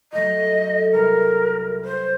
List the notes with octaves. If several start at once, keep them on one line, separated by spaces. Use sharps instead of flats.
F#3 A3 F#4 D#5
A4
C2 A#4 C#7
B4 C5